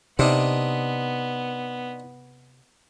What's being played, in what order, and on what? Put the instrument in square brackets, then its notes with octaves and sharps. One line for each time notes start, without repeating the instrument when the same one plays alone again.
[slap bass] C3 [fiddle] B3 [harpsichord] C4 D4 D#4